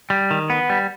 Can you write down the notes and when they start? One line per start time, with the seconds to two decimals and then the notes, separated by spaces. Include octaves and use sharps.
0.10 G3
0.31 D#3
0.50 B3
0.70 G3